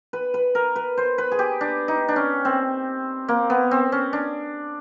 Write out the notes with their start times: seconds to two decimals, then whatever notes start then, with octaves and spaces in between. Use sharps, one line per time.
0.13 B4
0.34 B4
0.55 A#4
0.76 B4
0.97 C5
1.18 B4
1.32 G#4
1.39 G4
1.61 D4
1.88 D#4
2.08 D4
2.16 C#4
2.45 C4
3.28 A#3
3.50 B3
3.71 C4
3.92 C#4
4.13 D4